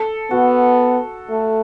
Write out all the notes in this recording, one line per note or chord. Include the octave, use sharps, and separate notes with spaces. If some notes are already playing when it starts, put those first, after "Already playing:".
Already playing: A4
B3 F#4
A3